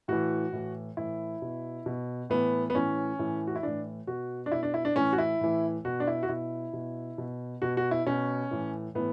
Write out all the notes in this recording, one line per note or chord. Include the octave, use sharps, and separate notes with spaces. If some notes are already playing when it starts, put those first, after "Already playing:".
A2 E3 F#4
A2 E3
A2 E3 E4
B2
B2
A2 E3 B3
B3
A2 E3 C#4
A2 E3
F#4
E4
A2 E3 D4
B2 F#4
D4
B2 E4
D4
E4
D4
A2 E3 C#4
F#4
E4
A2 E3
B2 F#4
D4
E4
F#4
B2 E4
B2
B2
B2 F#4
F#4
E4
B2 C#4
A2 E3
A2 E3 B3